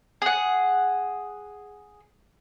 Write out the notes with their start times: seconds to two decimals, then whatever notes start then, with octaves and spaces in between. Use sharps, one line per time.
0.22 G#4 F#5